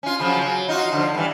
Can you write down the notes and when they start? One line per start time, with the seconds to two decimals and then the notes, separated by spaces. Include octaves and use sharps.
0.03 C#4 F4
0.19 C#3 F3 F#3
0.42 F#3
0.68 D#4 F4 F#4
0.92 D3 F3
1.15 G2 E3